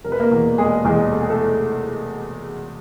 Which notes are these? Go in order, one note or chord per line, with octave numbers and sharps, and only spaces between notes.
F1 A#4
B4
A#3 A#4
E2 B2
F1 G#3 G#4
E2 B2 G#3 G#4
F1 A4
G#4
A3 A4